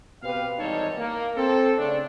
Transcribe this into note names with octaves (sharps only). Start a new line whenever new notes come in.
B2 C4 G4 B4 F5
G#1 E2 G3 D#4 A4 C#5
A#3
C4 A4
C#3 A3 C4 D4